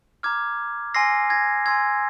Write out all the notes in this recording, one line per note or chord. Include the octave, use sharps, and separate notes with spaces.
A#5 D6 F6 G#6
G#5 C6 E6 A#6 C7
G#6 A#6
G#5 C6 E6 G#6